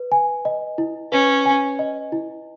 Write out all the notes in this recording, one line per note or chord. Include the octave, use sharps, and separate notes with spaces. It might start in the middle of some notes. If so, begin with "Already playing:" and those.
Already playing: B4
G#5
D#5
E4
C#4 B4
G#5
D#5
E4